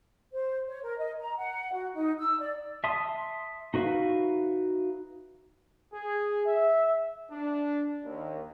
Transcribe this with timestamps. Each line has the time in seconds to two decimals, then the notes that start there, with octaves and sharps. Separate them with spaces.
0.32 C5
0.67 C#5
0.83 A#4
0.98 D#5
1.19 A#5
1.37 F#5
1.73 F#4
1.94 D#4
2.18 E6
2.39 D5
2.84 E5 A5 C6 D#6
3.74 D#4 F#4 B4 E5 F5
5.94 G#4
6.47 E5
7.31 D4
8.04 D#2